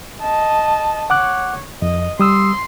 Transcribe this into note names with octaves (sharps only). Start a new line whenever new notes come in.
D#5 A5
C#5 F#5 D6 F#6
F2 D#5
G3 C6 D#6 E6